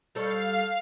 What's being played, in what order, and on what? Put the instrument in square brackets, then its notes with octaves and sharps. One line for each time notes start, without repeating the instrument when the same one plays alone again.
[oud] G3 A4 C#5 [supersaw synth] F5